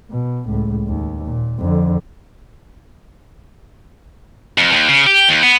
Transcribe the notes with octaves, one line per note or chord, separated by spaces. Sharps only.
B2
C#2 A2
D#2
A#2
F2 D3
F2
D#2
C#3
G4
D#2
B3